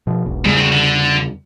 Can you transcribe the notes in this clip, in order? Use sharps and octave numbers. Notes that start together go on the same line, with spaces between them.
B2 F3
E1 B1
E2 G#2 C#3 G3
C4 F#4
D3